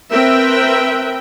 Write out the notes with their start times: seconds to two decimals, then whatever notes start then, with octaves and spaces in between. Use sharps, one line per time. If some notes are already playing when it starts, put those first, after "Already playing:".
0.11 C4 A#4 B4 E5 G5